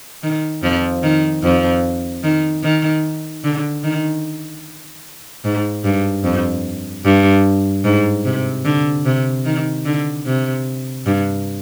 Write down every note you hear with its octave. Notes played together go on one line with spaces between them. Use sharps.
D#3
F2 F3
D#3
F2 F3
D#3
D#3
D3
D#3
G#2
G2
F2
G2
G#2
C3
D3
C3
D#3
D3
C3
G2